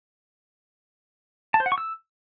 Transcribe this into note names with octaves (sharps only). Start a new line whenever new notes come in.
A5
C5
F#5
C#6
E6